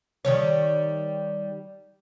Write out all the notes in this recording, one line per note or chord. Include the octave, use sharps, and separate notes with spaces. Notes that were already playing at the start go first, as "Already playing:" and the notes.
D#3 G3 C#5